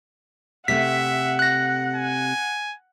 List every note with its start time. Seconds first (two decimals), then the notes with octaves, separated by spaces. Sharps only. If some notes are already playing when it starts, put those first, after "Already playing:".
0.68 C3 A3 E5 F#5 B6
1.39 F#6 A#6
1.95 G#5